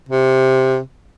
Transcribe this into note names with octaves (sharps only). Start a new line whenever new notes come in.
C3